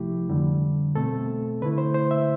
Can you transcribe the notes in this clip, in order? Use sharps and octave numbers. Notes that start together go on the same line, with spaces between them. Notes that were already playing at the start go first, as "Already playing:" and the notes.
Already playing: C2 C3 F3 A3 E4 G4
F2 D3 G3
B2 A3 C4 A4
D3 A3 E4 B4
C5
C5
E5